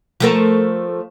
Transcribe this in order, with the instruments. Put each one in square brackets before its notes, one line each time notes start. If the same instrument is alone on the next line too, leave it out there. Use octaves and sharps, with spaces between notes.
[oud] F3 A3 A#4